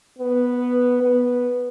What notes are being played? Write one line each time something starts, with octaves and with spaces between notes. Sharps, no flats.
B3
B3